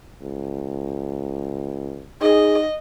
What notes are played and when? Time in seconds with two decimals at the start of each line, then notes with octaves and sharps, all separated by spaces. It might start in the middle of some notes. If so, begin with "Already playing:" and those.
0.22 C#2
2.22 D#4 G#4 D#5